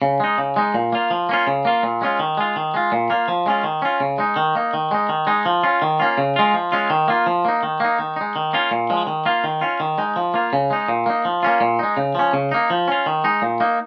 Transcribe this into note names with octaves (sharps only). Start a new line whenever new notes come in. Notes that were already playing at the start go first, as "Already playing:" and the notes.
C#3
G#3 D#4
C#3
G#3 D#4
A#2
A#3 F4
F3
A#3 C#4 F4
C#3
A#3 F4
A#2
G#3 C#4 F4
D#3
G#3 F4
D#3
G#3 F4
A#2
A#3 F4
F3
G#3 C#4 F4
D#3
C#4 F4
C#3
G#3 D#4
D#3
A#3 D#4
D#3
G#3 D#4
D#3
G#3 D#4
F3
C#4 F4
D#3
A#3 C#4 F4
C#3
G#3 F4
F3
G#3 C#4 F4
D#3
A#3 F4
F3
A#3 D#4
D#3
A#3 D#4
D#3
G#3 D#4
D#3
A#3 C#4 F4
A#2
F3 G#3
D#3
A#3 F4
D#3
C#4 F4
D#3
G#3 D#4
F3
A#3 F4
C#3
G#3 D#4
A#2
A#3 D#4
F3
A#3 C#4 F4
A#2
G#3 D#4
C#3
F3 C#4
C#3
A#3 D#4
F3
C#4 F4
D#3
G#3 D#4
A#2
A#3 D#4